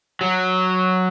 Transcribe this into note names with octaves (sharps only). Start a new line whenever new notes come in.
F#3